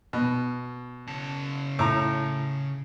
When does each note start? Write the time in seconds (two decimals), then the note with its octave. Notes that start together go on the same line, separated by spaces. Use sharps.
0.13 B2
1.07 C#3 A5
1.79 A2 A#5